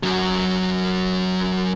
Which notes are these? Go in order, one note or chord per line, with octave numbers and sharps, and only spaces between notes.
F#2 F#3